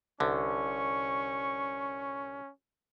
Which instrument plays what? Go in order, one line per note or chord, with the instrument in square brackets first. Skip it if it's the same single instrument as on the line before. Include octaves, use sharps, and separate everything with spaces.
[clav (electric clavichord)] C2 D3 [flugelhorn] C#4 [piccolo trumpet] C#6